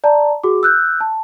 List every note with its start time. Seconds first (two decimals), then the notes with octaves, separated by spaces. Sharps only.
0.04 D5 A5 A#5
0.43 F#4 G#4 D6
0.63 E6 F#6 G6
1.01 A5